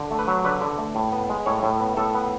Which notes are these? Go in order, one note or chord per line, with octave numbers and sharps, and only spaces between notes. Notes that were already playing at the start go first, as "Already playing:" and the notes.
Already playing: D3
A3
B4
F#3
D3 B4
D3
A3
A2
B3
G#3
A2 C#5
A2
B3
A2 A4
B3